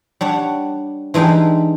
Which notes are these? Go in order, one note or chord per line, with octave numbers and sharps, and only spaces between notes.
G3 D4 C#5 F#5
E3 G#3 D4 D#4 G4